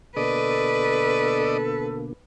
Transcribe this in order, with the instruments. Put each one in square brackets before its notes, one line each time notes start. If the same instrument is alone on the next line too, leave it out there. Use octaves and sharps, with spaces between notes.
[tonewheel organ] B2 D3 A#3 [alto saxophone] A4 [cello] B4 [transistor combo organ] D5 D#5